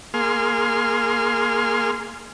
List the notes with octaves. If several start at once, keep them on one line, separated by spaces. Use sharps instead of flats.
A#3 G#4 C6 F6